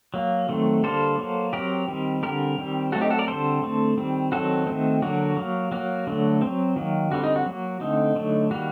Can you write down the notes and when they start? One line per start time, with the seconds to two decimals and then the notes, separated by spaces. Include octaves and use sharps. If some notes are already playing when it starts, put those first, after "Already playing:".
0.14 F#3 A#3
0.49 D#3 F#3 A3 C4
0.83 D3 G3 A#3 A4 C5
1.19 F#3 A#3
1.53 F#3 C4 G4 A#4
1.88 D#3 G3 C4
2.23 D3 G3 C4 G4 A#4
2.58 D#3 G3 C4
2.92 F#3 A3 C4 F#4 A4
3.01 D#4 G4
3.10 F#4 A4
3.19 A#4 D5
3.27 D3 G3 C4 A4 C5
3.62 D3 A3 C4
3.97 D#3 G3 C4
4.32 D#3 F#3 C4 F#4 A4
4.67 D#3 A3 C4
5.02 D3 F#3 A#3 F#4
5.37 F#3 A#3
5.72 F#3 A#3 F#4
6.07 D3 F#3 A3
6.42 F#3 C4
6.76 D#3 F#3 A#3
7.11 D3 G3 C4 F#4
7.24 D#4
7.36 F#4
7.46 F#3 A#3
7.81 D3 A3 C4 D#4
8.16 D3 F#3 A3
8.50 D#3 G3 A#3 F#4